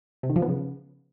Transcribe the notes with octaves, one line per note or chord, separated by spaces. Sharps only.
C3
D#3
F3
B3
C#3